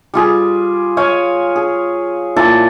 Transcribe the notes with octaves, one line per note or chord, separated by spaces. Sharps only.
G3 F4 G#4
C#5 F5 G#5
G#4
A#2 E4 A5